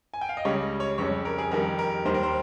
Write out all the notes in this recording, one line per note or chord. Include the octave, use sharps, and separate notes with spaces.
G#5
G5
F5
D#5
C#2 C#3 G3 C#5
C#5
F2 C#3 G3 C#5
A#4
G#4
F2 D#3 G3 A#4
A#4
D#2 D#3 G3 C5
A#4
C5